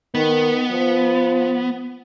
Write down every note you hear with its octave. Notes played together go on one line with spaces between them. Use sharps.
D#3 B3
F3